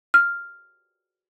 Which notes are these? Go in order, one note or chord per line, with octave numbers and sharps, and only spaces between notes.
F6